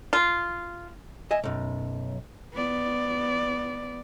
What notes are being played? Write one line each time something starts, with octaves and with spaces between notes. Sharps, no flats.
F4
D#5 E5 G#5
B1 F#2
B3 D5